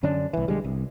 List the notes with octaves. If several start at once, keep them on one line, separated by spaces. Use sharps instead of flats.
F#2 D3 C#4 D4
C2 E3
B1 D3 G3 G#3
C2